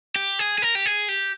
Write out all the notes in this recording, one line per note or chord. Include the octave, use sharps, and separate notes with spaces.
G4
G#4
G#4
A#4
G4
G#4
G4